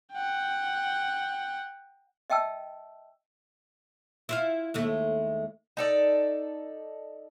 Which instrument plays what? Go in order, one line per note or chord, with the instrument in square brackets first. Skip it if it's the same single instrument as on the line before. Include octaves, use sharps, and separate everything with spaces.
[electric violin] F#5 G5
[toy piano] D#5 E5 G5 A5 E6
[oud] E4 F4 F5
D#2 G#3 A3
[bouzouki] D#4 A4 D5